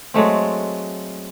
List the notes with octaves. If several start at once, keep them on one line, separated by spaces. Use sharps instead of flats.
F#3 G#3 A3 C4